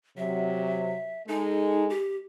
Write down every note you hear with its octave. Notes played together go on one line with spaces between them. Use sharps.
C3 F#3 E5
G#3 D#4 A4
G4